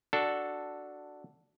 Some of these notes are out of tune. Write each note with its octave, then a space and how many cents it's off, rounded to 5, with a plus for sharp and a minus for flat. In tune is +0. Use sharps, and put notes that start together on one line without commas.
D4 +0 F#4 +0 A4 +0